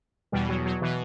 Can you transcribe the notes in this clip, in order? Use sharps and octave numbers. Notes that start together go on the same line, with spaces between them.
E2 B2 G3
F#3
F#3
B2 E3